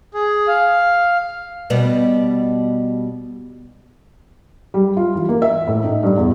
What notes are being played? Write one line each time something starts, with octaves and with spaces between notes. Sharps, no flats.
G#4
F5
B2 G3 B3
G3
F4
E3
A#3
E5
A2
D#4
G2
E2